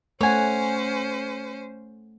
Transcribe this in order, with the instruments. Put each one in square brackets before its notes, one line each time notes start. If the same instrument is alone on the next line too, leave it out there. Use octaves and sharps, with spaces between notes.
[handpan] A3 F#5 [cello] C#4 C5 [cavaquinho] C#5 G#5